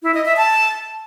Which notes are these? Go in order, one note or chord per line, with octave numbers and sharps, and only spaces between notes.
E4
D#5
E5
A5